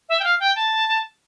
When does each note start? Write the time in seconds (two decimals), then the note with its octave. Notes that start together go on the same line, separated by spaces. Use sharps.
0.09 E5
0.20 G5
0.24 F5
0.40 G5
0.56 A5